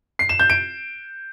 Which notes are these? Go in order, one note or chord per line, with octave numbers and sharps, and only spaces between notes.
C7
E7
G6
D7